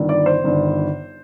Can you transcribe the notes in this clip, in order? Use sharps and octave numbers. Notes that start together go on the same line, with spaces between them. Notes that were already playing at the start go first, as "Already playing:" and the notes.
Already playing: G1 G2 D#3
D5
C5
G1 G2 D#3